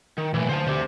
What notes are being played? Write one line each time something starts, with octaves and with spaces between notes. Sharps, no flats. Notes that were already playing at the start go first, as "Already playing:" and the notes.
D#3
B1 A2 E3
D2 C5 F#5 A5
D2 G4 C5